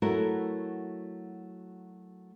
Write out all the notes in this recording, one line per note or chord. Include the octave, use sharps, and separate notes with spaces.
F#3 A3 E4 F#4 A#4